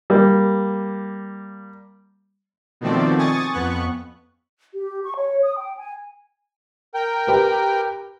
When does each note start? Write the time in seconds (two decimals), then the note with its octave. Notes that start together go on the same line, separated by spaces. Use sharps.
0.10 G3 A#3
2.81 B2 D#3 F3 A3 C4 D5
3.18 G#5 C#6 D#6 A6
3.53 F2 B3 C#6 F#6
4.74 G4
5.04 C#6
5.16 C#5
5.43 D#6
5.57 G5
5.78 G#5
6.95 A#4 G5
7.27 G4 B4